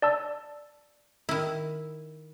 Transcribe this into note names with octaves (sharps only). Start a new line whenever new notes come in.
D5 A5 E6
D#3 E4